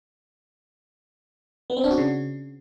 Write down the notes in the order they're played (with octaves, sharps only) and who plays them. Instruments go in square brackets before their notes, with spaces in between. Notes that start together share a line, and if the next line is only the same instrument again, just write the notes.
[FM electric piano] B3
C4
D4
F#4
C#3